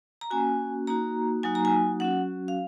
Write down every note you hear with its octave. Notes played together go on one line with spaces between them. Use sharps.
A#5
A#3 C#4 F#4 G#5
A#3 D#4 F#4 A#5
F#3 A#3 D#4 F#4 G#5
A#5
G#5
F#3 C#4 F#4 F#5
F5